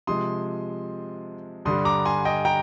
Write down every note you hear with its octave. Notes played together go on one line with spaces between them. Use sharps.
C3 F3 G#3 C6 D#6
G2 D3 G3 C6 D#6
A#5 D6
G#5 C6
D#5 G5
G5 A#5